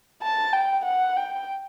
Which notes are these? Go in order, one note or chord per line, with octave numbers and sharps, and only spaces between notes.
A5
G5
F#5
G5